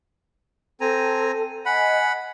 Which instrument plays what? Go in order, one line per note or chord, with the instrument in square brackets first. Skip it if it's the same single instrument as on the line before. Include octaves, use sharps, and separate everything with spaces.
[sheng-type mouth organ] C4 G#5 A#5 [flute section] A4
[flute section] D#5 G#5 [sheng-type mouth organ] F#5 B5